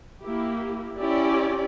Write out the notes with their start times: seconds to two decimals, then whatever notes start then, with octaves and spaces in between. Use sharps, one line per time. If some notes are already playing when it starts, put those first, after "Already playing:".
0.22 A#3 E4 G4
1.00 C#4 E4 G4 D5